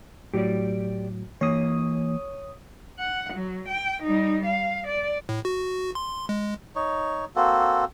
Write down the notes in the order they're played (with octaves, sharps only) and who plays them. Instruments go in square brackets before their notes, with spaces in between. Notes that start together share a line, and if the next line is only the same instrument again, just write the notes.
[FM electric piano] A2 F#3 [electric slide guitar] G4 D5
[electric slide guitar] E3 A#3 [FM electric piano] C#5 D#6
[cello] F#5
F#3
G5
G3 D#4
F5
D5
[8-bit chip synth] A2
F#4
C6
G#3
[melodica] D#4 C#5
A#3 C4 F#4 A4